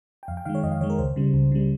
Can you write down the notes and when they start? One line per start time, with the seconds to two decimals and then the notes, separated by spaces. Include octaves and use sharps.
0.23 G5
0.28 F2 F5
0.37 G5
0.45 D#3 G#3 F5
0.55 C#5
0.63 F2 D#5
0.72 F5
0.81 D#3 G#3 C#5
0.90 A#4
0.99 C#2 C5
1.16 C#3 G3
1.34 C#2
1.52 C#3 G3